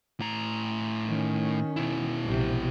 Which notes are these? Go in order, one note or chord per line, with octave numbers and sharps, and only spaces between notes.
A2 A#5
D#3 C#4
B2 E4
A#1 C3